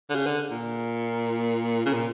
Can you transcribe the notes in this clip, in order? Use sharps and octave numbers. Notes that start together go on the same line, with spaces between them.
D3
C#3
D3
A#2
C#3
A#2